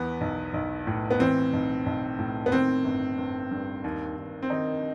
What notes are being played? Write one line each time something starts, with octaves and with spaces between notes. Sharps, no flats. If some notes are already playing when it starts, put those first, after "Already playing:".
Already playing: E2 E3 B3
B1
B1
A2
B3
E3 C4
B1
B1
A2
B3
D#3 C4
G1
G1
G2
D#2
D#2
C4
D#3 D#4